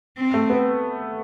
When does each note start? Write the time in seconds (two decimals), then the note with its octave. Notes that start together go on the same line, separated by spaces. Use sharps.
0.18 C4
0.34 A3
0.50 B3